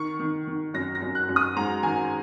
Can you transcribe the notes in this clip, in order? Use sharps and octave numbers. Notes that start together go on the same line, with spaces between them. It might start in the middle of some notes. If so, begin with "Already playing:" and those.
Already playing: D#3 C#6
D#3
D#3
F#2 A#6
A#6
F#2
F#6
F#2
D#6
G#2 A#5
D#3 G#5